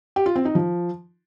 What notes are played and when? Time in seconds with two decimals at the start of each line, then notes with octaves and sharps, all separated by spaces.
0.16 G4
0.26 F4
0.36 C4
0.45 D#4
0.55 F3